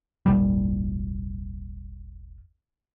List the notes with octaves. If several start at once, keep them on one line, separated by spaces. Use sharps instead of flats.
D#1 G#1 G3